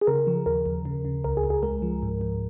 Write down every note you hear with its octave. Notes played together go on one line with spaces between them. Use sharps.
G#4
C#3 A#4
F3
D#2 A#4
D#2
C#3
C#3
C#2 A#4
G#4
C#2
G#4
G#3 A#4
F3
G#2
G#2